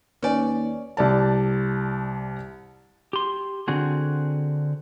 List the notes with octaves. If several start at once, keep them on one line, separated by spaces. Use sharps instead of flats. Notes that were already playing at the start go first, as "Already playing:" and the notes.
D#2 C#4 B4 C#5 D5 G#5
C2 D5 A5
G4 C6
D3 C4 F#4 G#4